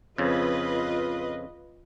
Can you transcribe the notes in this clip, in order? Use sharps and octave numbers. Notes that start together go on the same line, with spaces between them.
F2 C#3 F4 B4 D#5